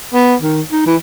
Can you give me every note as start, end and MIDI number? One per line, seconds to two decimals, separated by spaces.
0.14 0.35 59
0.42 0.61 51
0.72 0.83 63
0.86 0.96 52